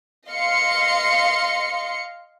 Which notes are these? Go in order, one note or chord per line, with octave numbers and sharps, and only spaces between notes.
D#5 F5 C6 C#7